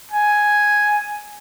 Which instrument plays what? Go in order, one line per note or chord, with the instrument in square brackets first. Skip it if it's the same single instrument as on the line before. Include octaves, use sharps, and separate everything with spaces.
[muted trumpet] G#5